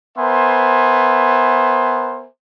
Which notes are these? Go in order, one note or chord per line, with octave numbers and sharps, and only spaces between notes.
B3 A#4 C5 E5 G#5 C6